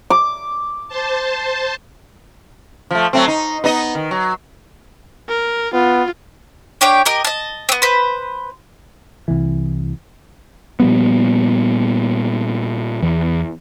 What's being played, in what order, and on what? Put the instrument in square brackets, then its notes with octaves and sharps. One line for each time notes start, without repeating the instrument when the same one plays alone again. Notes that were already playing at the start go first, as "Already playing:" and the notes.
[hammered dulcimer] D6
[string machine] C5 A5
[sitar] F3 A3
F#3 A3 C4
D#4
B3 D#4 D#5
D#3
F#3
[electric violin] A#4
[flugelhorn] B3 [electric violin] F4
[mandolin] D4 G4 C#5 G5
G4 A#4 D#5
D#5 A5
B3 C4
B4 C5
[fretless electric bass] C2 E3
[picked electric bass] A#2 F3 G3 B3
E2